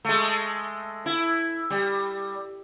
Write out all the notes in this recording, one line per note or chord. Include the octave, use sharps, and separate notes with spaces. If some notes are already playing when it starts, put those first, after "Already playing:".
G#3 A3
E4
G3